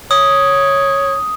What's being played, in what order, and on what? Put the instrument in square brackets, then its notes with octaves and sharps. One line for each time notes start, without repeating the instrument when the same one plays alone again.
[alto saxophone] C#5 [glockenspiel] D#6